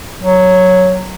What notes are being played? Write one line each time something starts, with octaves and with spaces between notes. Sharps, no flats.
F#3